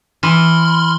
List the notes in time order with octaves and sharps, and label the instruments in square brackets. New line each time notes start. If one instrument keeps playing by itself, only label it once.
[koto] E3 [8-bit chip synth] B5 C6 F6